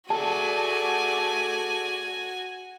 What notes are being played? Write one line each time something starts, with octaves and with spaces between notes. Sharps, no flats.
A3 F#4 G#4 A4 D5 G#5 A5